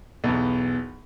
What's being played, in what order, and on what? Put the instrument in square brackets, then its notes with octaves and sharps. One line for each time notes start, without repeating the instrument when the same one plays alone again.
[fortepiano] B1 E2